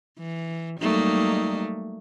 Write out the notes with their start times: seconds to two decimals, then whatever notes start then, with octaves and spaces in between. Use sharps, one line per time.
0.19 E3
0.80 F#3 G3 A3 A#3 D#4